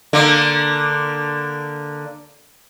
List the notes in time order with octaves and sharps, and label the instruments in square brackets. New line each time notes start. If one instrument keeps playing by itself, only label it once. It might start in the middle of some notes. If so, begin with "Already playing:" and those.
[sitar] D3 A#3